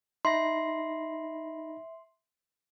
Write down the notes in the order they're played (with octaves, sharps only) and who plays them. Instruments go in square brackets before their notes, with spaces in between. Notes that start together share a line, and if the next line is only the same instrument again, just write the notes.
[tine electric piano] D#4 B5 A#6 [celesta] E5 [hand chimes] C6